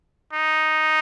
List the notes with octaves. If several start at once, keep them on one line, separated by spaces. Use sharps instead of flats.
D#4